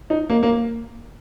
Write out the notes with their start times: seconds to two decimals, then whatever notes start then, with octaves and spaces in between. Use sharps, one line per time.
0.10 D#4
0.30 A#3
0.43 A#3